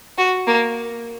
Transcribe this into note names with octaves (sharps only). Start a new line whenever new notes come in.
F#4
A#3